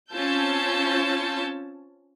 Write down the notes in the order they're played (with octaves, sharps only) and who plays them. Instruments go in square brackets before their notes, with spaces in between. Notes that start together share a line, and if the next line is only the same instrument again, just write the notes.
[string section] C4 C#4 F4 A5 E6 G6